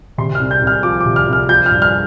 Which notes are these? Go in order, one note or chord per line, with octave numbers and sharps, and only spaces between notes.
C3 C6
F6
C2
G6
C2
F6
F3 D6
D6
C3
F6
C2
F6
F3 G6
F6
G2
F6